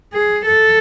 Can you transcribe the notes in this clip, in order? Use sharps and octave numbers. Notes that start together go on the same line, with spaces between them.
G#4
A4